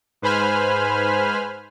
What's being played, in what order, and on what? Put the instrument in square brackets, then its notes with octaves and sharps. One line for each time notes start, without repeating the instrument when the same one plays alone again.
[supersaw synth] G#2 B4 C5 G#5 B5 F6